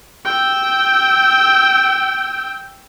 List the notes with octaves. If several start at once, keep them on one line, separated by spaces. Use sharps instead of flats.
G5 E6